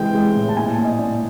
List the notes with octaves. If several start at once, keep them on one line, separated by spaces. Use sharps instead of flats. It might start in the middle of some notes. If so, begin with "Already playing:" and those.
Already playing: C3 E3 G#3 G5
G#3
A2
A5
A#2 G#5
A#2
D#5
A#2 D5